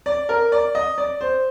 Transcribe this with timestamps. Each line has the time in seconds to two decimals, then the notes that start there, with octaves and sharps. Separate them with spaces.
0.06 D5
0.29 A#4
0.52 D5
0.75 D#5
0.98 D5
1.21 C5